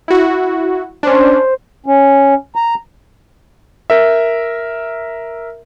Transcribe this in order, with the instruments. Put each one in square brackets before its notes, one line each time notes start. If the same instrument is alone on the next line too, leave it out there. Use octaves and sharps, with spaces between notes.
[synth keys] E4 F#4
[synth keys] C#4 D4 [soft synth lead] C5
[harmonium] C#4
A#5
[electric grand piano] A#4 E5